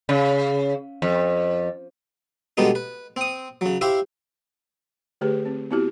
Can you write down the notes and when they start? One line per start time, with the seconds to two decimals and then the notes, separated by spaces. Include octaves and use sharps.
0.09 C#3
1.02 F2
2.57 B2 D3 G3 G#3 B3 D#4
2.75 B4
3.16 C4 D#6
3.61 C#3 F#3
3.81 E4 G4 C5 E5 F5
5.21 D3 A3 G4 G#4 B4
5.45 C4
5.71 B3 C4 E4 F#4 G4